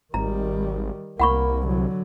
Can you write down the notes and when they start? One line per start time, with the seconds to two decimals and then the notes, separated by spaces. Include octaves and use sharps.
0.14 G#1 D#3 G3 A#5
1.20 C2 A#3 F#5 B5 C#6
1.63 D3 F#3